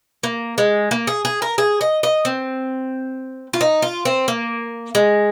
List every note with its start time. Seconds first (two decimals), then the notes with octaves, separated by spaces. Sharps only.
0.23 A#3
0.58 G#3
0.91 A#3
1.07 G#4
1.25 G#4
1.42 A#4
1.58 G#4
1.81 D#5
2.03 D#5
2.25 C4
3.53 F4
3.61 D#4
3.82 F4
4.05 C4
4.28 A#3
4.95 G#3